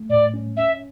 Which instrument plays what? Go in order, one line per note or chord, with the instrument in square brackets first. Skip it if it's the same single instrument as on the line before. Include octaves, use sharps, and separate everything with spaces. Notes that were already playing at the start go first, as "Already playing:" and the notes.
Already playing: [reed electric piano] A3
[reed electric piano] A2 [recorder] D5
[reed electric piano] C#4
[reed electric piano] C#4 [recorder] E5